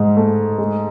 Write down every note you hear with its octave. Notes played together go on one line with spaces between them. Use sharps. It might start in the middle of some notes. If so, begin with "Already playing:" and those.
Already playing: G#2 G#3
A3
G#3